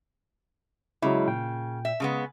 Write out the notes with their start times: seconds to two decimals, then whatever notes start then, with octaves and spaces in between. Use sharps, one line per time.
1.02 C#3 F#3 G#3 E4
1.28 A#2 G5
1.85 E5
2.00 C#3 G#3 B3